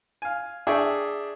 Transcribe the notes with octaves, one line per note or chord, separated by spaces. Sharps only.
F5 G#5
D4 G#4 E5 G5 C#6